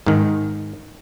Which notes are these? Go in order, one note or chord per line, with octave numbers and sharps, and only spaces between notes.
G#2 D#3